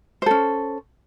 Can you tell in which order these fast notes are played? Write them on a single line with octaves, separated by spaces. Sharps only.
C5 A4 C#4